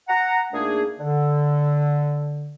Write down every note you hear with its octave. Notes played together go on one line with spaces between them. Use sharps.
F#5 A#5
A#2 A3 A#3 D4 D#4 G#4
D3